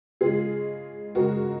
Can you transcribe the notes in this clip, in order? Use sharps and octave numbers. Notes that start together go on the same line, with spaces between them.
C#3 G#3 F4 G#4
C#3 G#3 F#4 A#4